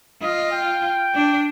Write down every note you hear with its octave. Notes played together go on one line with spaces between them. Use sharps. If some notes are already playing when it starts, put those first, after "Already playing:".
F4 D#5
G5
D4